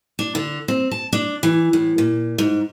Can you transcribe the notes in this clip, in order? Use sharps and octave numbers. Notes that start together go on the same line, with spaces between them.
D4
D3
C4
A5
D4
E3
A2
A#2
G#2